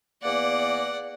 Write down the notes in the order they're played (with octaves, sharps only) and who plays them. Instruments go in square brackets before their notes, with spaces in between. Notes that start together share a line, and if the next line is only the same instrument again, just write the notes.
[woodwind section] E2 A#3 B3 [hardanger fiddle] D5 F#5